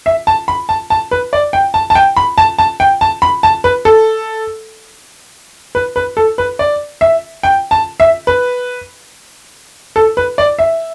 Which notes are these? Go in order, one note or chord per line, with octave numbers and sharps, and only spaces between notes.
E5
A5
B5
A5
A5
B4
D5
G5
A5
A5
G5
B5
A5
A5
G5
A5
B5
A5
B4
A4
B4
B4
A4
B4
D5
E5
G5
A5
E5
B4
A4
B4
D5
E5